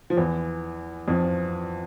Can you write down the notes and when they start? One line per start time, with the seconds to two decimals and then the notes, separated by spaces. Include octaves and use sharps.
0.10 F3
0.17 E2 E3
1.08 F2 F3